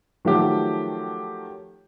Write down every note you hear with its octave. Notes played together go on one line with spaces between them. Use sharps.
D#3 F3 F#3 A3 F#4 G4